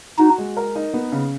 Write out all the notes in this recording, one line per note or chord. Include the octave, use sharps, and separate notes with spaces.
D#4 F#4
G#3
A#4
D#4
B3
C#3